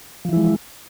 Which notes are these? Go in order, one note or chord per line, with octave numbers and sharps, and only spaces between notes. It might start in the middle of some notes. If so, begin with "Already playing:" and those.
E3 F3 G#3 E4